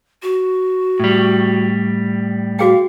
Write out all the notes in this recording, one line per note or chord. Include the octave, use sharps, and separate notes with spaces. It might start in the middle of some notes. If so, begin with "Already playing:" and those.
F#4
A2 G3
F#4 G#4 F5 G5